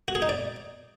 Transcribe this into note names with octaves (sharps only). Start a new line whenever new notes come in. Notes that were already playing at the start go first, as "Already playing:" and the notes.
F#4
G#4
D#4
D5